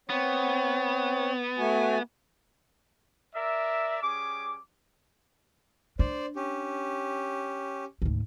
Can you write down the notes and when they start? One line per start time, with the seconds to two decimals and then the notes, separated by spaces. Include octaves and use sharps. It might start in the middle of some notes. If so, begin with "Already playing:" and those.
0.10 B3 C4 C#5
1.58 A3 F#4 G#5
3.34 A#4 D5 E5
4.02 G3 C#4 G#4 D6
5.99 D4 C5 D5
6.36 C#4 G4
8.02 D2 G#2